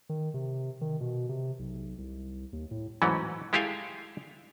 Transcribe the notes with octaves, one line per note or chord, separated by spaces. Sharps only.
D#3
C3
D#3
B2
C3
B1
C2
D#2
A2
G#2 E3 F#3 A3 C#4
G#3 E4 G4 A4 F5 G#5